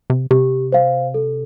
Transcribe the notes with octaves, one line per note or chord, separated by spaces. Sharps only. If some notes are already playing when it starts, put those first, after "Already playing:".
C3
C3 G4
C5 F5
A4